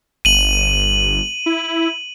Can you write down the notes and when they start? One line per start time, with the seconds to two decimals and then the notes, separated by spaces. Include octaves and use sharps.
0.25 G1 D#7 F#7
1.46 E4